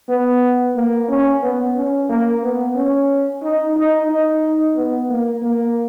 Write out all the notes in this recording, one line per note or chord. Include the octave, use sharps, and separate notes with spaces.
B3
A#3
C#4
B3
C#4
A#3
B3
C#4
D#4
D#4
D#4
B3
A#3
A#3